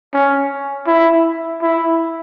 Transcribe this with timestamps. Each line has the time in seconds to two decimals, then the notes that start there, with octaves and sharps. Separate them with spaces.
0.13 C#4
0.87 E4
1.62 E4